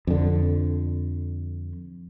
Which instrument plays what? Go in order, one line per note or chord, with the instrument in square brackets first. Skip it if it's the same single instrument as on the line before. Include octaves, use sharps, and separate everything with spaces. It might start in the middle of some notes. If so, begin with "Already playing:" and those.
[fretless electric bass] F2 D3